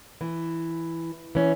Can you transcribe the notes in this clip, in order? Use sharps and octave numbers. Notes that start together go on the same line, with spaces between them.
E3
E3 C#4